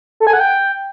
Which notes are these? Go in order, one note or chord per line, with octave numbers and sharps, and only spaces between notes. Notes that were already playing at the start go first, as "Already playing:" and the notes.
A4
G#5
F#5
G5